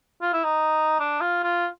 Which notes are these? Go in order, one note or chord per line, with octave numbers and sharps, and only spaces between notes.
F4
E4
D#4
D4
F4
F4